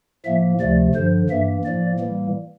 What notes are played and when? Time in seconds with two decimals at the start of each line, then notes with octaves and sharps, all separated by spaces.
0.25 A2 F3 A#3 E5
0.60 D2 C3 F3 A3 D5
0.95 G2 D3 F3 C5
1.30 G2 E3 A#3 E5
1.64 A2 F3 A#3 D5
1.99 A2 E3 G3 A#3